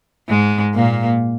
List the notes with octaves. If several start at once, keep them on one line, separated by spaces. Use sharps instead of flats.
G#2 G#3
A#2 A#3